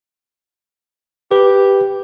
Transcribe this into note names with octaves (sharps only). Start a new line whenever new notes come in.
G4 B4